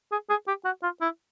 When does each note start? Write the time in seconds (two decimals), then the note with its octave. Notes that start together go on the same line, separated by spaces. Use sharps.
0.12 G#4
0.29 G#4
0.47 G4
0.65 F#4
0.83 F4
1.01 E4